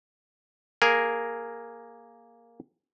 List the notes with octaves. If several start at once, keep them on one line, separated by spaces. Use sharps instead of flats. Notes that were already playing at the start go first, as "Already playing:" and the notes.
A#3 G#4 A#4